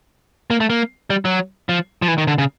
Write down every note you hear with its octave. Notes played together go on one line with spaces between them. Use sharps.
A#3
A3
A#3
G3
F#3
F3
F3
E3
D#3
D3
C#3